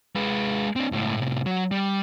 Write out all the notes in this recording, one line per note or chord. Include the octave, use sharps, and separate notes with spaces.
G#3 B4
C4 D4
C#2 A2
A2 C3
F#3
G3